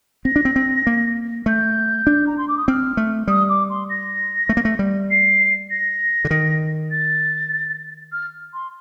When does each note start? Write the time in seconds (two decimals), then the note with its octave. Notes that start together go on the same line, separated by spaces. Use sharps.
0.25 C4 A#6
0.36 D4
0.45 C4
0.56 C4
0.87 A#3
1.46 A3 G6
2.07 D4
2.26 A#5
2.37 C6
2.48 D6
2.57 D#6
2.68 C4 F6
2.97 A3
3.28 G3 D#6
3.49 D6
3.69 C6
3.89 A#6
4.49 A3
4.57 A#3
4.65 A3
4.79 G3
5.10 C7
5.70 A#6
6.25 D3
6.31 D#3
6.91 A6
8.12 F6
8.53 C6